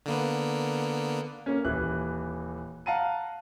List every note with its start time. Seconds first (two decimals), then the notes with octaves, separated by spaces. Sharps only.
0.06 D3 A#3 B3
1.46 A#3 C#4
1.64 D#1 E3 F#6
2.86 F5 F#5 A5 A#5 D#7